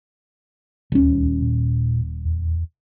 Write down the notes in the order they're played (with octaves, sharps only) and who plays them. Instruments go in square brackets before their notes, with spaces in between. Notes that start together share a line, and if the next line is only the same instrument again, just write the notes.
[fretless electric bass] D#1 C#4 [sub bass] D2
[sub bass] A#2
E2